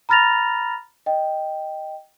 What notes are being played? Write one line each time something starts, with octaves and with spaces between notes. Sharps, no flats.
A#5 B5 F6 A6 A#6 F7
D#5 G5